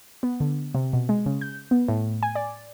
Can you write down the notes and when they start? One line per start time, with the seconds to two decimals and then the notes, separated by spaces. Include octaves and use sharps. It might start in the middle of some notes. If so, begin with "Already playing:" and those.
0.23 B3
0.40 D3
0.75 C3
0.93 B2
1.09 G#3
1.26 C#3
1.41 G6
1.71 B3
1.88 A2
2.23 G#5
2.35 D5